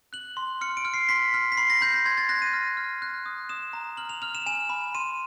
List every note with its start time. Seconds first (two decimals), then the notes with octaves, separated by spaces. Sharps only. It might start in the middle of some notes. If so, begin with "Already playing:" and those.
0.13 F#6 F#7
0.37 C6
0.61 F6 C#7
0.77 D7
0.85 F6
0.94 C7
1.09 C6 B6
1.34 F6
1.52 B6
1.57 B5 C7
1.70 A#6
1.81 B5 G6
1.94 G6
2.05 C6 G#6
2.18 A6
2.29 F#6 A#6
2.42 D#7
2.53 F6
2.77 F6
3.02 F#6
3.26 D#6
3.49 D#6 E7
3.73 A#5
3.97 F6 F#7
4.09 F7
4.22 F6 F7
4.35 E7
4.46 G#5 E7
4.70 B5
4.95 C6 D#7